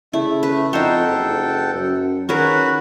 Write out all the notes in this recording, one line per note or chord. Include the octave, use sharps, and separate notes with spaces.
C#3 A3 E4
B4
F2 D#4 A4 C5 F#5 G5
F#1
F#2
D#3 C#4 F#4 G#4 A#4 B4